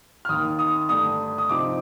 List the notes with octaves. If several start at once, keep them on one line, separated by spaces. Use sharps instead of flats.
F6
D#2 D#3 A#3 D#6
D#6
G2 D3 A3 D#6
D#6
C3 F3 C4 D#4 D6